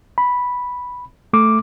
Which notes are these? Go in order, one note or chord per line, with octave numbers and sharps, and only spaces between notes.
B5
A3 D6